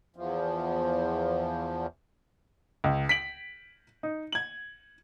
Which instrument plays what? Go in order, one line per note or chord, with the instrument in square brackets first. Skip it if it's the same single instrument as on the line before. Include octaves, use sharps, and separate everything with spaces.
[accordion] E2 F3
[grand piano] C#2
B6 D7 F#7
D#4
G#6 F#7